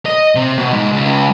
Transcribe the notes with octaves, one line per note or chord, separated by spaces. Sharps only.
D#5
C3
B2
G#2
C#2